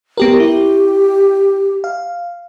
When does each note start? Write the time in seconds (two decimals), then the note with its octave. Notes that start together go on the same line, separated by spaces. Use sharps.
0.17 B3 G4 A#4
0.40 E4 G4
1.84 F5